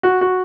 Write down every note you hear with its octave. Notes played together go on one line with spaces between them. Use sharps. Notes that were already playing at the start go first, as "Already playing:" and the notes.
F#4
F#4